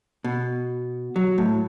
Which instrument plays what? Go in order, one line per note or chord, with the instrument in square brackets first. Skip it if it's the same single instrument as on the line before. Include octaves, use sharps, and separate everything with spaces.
[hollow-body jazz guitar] B2
F#3
A2